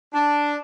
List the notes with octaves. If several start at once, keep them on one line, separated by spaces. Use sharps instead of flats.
D4